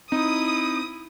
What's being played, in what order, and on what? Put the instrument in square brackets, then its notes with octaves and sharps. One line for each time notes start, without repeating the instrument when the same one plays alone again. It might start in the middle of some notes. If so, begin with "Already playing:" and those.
[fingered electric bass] C4 [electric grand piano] D#4 [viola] E4 [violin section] D#6